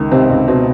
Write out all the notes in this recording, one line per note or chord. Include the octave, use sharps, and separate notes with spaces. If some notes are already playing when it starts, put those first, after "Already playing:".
Already playing: C#2 D#3
C3 C4
C#2
B2 C4